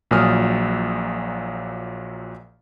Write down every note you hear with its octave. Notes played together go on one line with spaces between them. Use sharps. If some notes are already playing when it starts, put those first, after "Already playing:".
A#1 A#2 F#3 G#5 D#6 F6